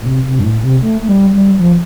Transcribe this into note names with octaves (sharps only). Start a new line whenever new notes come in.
A2
C3
C3
G2
A2
C3
A3
A3
G3
G3
F3